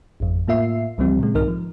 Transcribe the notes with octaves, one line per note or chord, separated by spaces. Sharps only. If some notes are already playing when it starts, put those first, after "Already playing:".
G#1 F2
A2 A#3 F4 E5 C7
C#2 E3 F3 G3 C4
A#2 C#3 G#3
B1 G#2 D#3 D#4 A#4 F6
F3